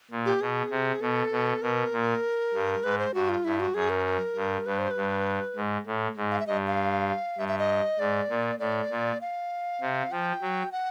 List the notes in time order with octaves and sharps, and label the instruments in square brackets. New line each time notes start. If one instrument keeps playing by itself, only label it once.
[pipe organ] A#2
[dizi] G4
[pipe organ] B2 [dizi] G#4
[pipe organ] C3
[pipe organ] B2 [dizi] A4
[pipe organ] B2
[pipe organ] B2 [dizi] A#4
[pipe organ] A#2
G2
[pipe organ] G#2 [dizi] B4
[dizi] C5
[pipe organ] G2 [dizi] F#4
[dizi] F4
[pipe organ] G2 [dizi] E4
[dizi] F#4
[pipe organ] F#2 [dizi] G#4
[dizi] A#4
[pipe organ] G2
[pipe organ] G2 [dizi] B4
[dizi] C5
B4
[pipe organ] G2
G#2
A2
G#2
[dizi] F5
E5
[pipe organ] G2 [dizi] D#5
[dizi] F5
[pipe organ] G2 [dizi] E5
[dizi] E5
D#5
[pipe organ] G#2 [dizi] D5
[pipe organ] A#2
[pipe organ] A2 [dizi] D5
[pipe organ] A#2
[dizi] F5
[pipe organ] C3
[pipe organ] F3 [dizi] G5
[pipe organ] F#3
[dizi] F#5